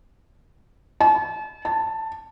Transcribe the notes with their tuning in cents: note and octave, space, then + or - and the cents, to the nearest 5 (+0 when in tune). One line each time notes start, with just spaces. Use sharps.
A5 -40
A5 +10